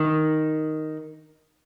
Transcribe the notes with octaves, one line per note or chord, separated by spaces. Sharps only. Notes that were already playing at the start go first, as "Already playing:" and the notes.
Already playing: D#3